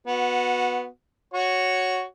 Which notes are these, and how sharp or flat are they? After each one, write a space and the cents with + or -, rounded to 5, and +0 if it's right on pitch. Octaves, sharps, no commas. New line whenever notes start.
B3 -5 F#4 -20
F#4 +0 C#5 +0